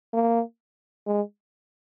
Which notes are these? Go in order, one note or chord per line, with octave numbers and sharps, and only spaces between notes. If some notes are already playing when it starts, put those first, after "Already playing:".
A#3
G#3